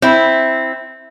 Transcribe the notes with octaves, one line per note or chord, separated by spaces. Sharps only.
C4 E4